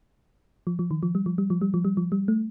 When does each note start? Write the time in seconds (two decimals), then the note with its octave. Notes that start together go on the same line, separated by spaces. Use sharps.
0.67 F3
0.79 F3
0.91 D#3
1.03 F3
1.15 G3
1.26 F3
1.38 G3
1.50 F3
1.61 G3
1.74 F3
1.85 G3
1.97 F3
2.12 G3
2.28 A3